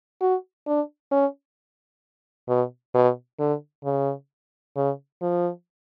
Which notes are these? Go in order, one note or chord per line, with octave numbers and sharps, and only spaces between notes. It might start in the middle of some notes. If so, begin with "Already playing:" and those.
F#4
D4
C#4
B2
B2
D3
C#3
C#3
F3